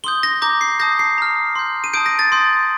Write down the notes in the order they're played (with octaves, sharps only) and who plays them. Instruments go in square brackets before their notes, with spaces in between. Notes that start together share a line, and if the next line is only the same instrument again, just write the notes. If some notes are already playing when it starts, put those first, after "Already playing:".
[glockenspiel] C6 D#6 G6 G7
A#6
A#5 D6 G6 A#6
C7
A5 D#6 G6 A#6
C7
A#5 F6
C6 G6
D#7
A5 D#6 G6 D7
A#6
A6
C6 D#6 G6